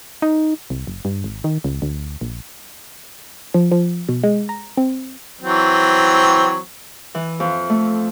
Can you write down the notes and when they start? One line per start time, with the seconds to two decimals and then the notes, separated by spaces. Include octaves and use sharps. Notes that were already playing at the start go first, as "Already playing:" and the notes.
0.22 D#4
0.70 C2
0.87 F#1
1.05 G2
1.24 G#1
1.44 D#3
1.64 C#2
1.82 D2
2.21 A#1
3.54 F3
3.72 F3
4.09 B2
4.24 G#3
4.49 A#5
4.77 C4
5.42 E3 F#3 C4
7.15 E3
7.40 F2
7.70 A3